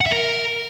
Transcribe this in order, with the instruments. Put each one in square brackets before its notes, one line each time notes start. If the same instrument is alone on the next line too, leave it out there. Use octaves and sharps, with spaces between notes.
[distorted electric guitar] F#5
E5
A#4